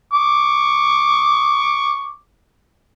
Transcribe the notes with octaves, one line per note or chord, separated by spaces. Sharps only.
C#6 D6